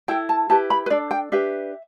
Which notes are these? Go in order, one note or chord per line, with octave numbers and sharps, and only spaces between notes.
E4 A4 G5
A5
E4 G4 B4 A5
B5
B4
D4 A4 D5
G5
D4 G4 B4 E5